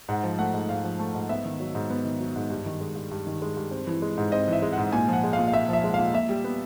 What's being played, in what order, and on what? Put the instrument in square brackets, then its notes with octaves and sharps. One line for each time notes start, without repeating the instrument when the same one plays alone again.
[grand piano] G#2 F#5
F3
A3 F#5
G#2
G#2 F5
F3
A3
G#2
B3 E5
D#3
F#3
G#2
B3
D#3
F#3
G#2
G2
D#3
G#3
G2
G2
D#3
G#3
G2
C4
E3
G#3
G#2
C4 D#5
E3 E5
G#3
G#2 F#5
A#2 G#5
F3
F#5
G#3
F5
A#2
F5
A#2 E5
F3 E5
G#3
A#2 F5
A#2 E5
G3
B3